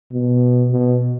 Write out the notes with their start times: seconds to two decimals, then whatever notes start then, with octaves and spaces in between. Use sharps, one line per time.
0.12 B2
0.71 B2